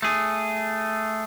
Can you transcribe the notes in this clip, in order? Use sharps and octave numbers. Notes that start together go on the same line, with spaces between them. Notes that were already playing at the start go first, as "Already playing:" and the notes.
A3 G#4